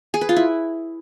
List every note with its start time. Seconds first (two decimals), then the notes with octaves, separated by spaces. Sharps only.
0.14 G#4
0.21 B4
0.29 F4
0.36 E4